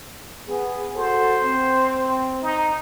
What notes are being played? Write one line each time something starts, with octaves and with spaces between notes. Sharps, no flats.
B3 G#4
F#4 A4 C5
C4
D#4